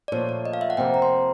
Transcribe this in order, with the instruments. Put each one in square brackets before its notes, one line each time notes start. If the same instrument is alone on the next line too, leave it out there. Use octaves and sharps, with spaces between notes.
[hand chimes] D5
[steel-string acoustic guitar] A#2 F3 A3 [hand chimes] C#5
[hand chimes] D5
D#5
F5
E5
F#5
[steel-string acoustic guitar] F2 C3 F3 A#3 [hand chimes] G5
[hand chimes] A#5
C6